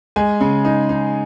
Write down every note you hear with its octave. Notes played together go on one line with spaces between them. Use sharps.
G#3 G#5
C#3
D#4
D#4